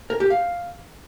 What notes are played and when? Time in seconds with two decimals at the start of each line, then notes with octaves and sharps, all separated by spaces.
0.10 A#4
0.20 G4
0.30 F5